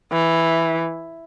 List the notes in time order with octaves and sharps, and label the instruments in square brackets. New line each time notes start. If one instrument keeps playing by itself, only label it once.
[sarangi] E3